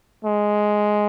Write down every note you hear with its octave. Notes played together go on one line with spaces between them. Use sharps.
G#3